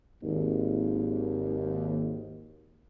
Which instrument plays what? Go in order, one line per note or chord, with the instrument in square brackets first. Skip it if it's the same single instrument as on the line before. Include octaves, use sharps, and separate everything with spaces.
[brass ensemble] G#1 D#2